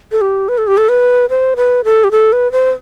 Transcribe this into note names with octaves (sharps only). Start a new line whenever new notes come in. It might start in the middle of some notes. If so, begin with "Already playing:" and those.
A4
G4
B4
A4
G4
A4
B4
C5
B4
A4
G4
A4
B4
C5